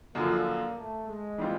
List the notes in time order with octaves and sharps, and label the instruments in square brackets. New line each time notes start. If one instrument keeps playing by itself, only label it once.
[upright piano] F#2 D3 F3 [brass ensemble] A#3
[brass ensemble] A3
G#3
[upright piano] E3 G3 C4 F4